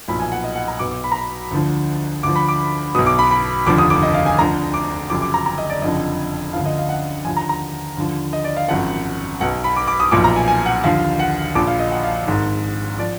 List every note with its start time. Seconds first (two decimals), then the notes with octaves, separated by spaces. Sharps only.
0.08 B1 A#2 F3 B5
0.20 G#5
0.32 F#5
0.44 D#5
0.56 F#5
0.68 A#5
0.79 B1 B2 D6
0.91 D6
1.04 B5
1.12 A#5
1.15 B5
1.51 D2 D3 F3
2.23 D2 D3 F3 D6
2.36 B5
2.48 D6
2.95 B2 D#6
2.98 B1
3.07 D6
3.19 B5
3.31 B5
3.66 F1 D#2 D3 F3 D6
3.78 D#6
3.90 D6
4.02 D#5
4.14 F5
4.26 G#5
4.38 D2 D3 F3 A#5
4.74 D6
5.09 F#1 F#2 F3 D6
5.22 D6
5.34 A#5
5.46 A#5
5.58 D#5
5.70 D5
5.81 F#1 F2 D3 F3 D#5
6.53 D2 D3 F3 F5
6.65 D#5
6.78 F5
6.89 F#5
7.25 D#2 D3 F3 G#5
7.37 A#5
7.49 A#5
7.97 D#2 D3 F3
8.33 D#5
8.44 D5
8.57 F5
8.68 G#1 F#2 F3 F#5
9.41 B1 B2 F#5
9.64 B5
9.76 D6
9.88 D6
10.00 D#6
10.11 B1 A#2 F3 D6
10.24 A#5
10.36 G#5
10.48 G#5
10.66 F#5
10.84 D#2 D3 F3 F5
11.19 F#5
11.55 A#1 A#2 F3 D6
11.67 F5
11.79 D#5
11.91 F#5
12.04 F5
12.27 G#1 G#2 D#3
12.98 F3 D5